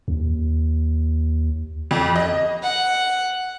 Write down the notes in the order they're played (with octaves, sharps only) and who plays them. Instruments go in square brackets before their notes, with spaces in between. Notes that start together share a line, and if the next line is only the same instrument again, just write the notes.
[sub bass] D#2
[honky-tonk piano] F2
D#5
[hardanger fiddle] F#5